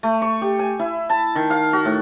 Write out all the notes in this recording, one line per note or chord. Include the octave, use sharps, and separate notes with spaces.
A3
C#6
G4
G#5
E4
A5
D#3
F5
F#4
A2